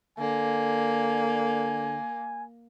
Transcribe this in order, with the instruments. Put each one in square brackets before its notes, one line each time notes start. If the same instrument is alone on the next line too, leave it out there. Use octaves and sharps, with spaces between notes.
[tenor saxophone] D3 [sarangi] A#3 [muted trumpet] G#5